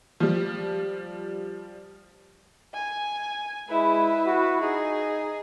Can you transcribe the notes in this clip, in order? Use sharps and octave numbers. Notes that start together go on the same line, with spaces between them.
F3 G3
G#5
G#3 E4 B4
F#4
D#4 G#4